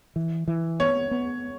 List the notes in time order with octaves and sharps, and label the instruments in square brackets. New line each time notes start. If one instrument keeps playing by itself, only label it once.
[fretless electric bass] E3
E3
[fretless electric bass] B3 [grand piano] C#5
[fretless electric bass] B3